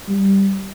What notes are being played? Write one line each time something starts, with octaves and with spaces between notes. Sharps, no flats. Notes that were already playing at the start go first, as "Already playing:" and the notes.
G3